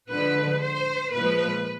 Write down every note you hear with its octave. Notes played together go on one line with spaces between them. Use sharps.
D3 F3 G#3 B4
C5
A#2 F3 G#3 B4